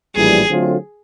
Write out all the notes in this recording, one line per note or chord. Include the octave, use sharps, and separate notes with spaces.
A#1 A2 E3 G3 G#4
D3 F#3 A3 C4 F4